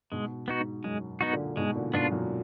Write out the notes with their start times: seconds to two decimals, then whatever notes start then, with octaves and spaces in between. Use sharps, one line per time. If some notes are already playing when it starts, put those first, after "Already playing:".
0.12 G#2 B2 G#3
0.48 B3 D#4 F#4
0.60 G#2
0.84 F#2 G#3
1.21 B3 D#4 F#4
1.33 A#2 D3
1.57 G#2 B2 G#3
1.75 A#2 D3
1.94 G#2 B2 B3 D4 F4
2.11 F#2 A#2